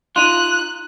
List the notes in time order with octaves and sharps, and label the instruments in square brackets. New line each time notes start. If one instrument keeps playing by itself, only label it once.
[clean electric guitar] D#4 F4 [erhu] F#6